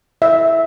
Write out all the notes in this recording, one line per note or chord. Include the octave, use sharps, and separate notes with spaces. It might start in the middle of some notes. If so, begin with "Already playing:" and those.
E4 E5